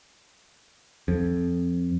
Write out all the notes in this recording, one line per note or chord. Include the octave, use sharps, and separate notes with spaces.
F2